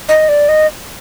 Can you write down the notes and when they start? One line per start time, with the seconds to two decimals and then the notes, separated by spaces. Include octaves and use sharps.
0.09 D#5
0.29 D5
0.49 D#5